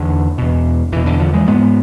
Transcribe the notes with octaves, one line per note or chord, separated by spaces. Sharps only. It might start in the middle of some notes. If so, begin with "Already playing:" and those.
Already playing: E2 D3
E2 B2
E2 B2 E3
D3
D3 F3
E3 G#3
G#2 G#3 B3